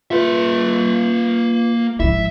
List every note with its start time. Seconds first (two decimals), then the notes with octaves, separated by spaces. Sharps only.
0.11 A#3 F4 B4 E5
2.00 G#1 F3 E4 E5